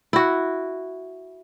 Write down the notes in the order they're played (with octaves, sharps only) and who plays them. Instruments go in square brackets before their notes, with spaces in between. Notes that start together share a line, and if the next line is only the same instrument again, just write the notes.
[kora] E4 F#4